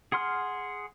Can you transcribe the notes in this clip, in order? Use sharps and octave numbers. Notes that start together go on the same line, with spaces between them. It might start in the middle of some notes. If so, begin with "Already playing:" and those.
G#4 F#5 C6 F6